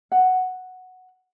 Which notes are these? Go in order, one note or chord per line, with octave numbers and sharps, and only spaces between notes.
F#5